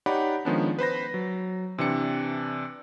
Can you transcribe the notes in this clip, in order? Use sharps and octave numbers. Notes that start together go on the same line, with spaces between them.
D#4 G4 C#5 D5 F#5 B5
D#3 F3 G#3 B3 C#4 D4
B4 C5 B5 A#6
F#3
C3 E3 D4 C#7